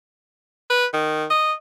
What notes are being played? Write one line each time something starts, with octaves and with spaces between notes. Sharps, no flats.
B4
D#3
D#5